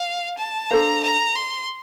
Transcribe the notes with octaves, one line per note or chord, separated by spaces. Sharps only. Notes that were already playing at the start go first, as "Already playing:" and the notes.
Already playing: F5
A5
D4 A4 C5 F5 A#5
A#5
C6